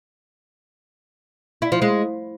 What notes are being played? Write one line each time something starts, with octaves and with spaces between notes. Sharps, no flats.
E4
F3
G#3